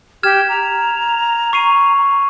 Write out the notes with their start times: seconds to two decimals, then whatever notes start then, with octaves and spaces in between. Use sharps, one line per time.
0.23 G4 F6 G#6 E7
0.49 A#5
1.53 C#6 C7 D#7